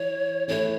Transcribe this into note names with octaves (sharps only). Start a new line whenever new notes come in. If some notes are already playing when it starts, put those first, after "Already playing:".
Already playing: E3 C#5
E3 A3 E4 C#5